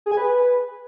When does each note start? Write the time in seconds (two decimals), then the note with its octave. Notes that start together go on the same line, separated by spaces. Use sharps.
0.06 G#4
0.12 G#5
0.17 B4